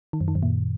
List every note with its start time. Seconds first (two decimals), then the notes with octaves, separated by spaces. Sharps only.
0.13 D#3
0.21 F#2
0.28 D#3
0.35 F#2
0.43 A#2